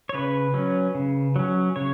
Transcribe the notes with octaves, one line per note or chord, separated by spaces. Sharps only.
C#5
C#3 B4
F#3 C#4
C#3
F#3 C#4
C#3 C#5